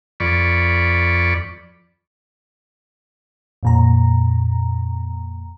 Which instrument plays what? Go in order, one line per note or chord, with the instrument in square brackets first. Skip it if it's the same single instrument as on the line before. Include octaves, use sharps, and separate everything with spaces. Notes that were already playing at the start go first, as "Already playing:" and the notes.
[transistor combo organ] F2 D5 B5 C#6
[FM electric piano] F2 A#2 A#5